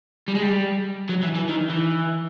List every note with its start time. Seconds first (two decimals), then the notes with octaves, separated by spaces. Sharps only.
0.28 G3
0.34 G#3
0.42 G3
1.09 F#3
1.23 E3
1.36 E3
1.49 D#3
1.70 E3